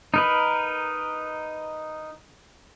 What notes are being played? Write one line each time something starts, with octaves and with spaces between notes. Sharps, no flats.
D#4 A#4 B4